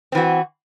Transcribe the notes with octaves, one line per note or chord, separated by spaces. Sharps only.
E3 C4 F#4